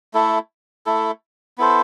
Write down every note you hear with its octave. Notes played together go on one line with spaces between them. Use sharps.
A3 E4 A4
A3 E4 A4
B3 E4 A4 C5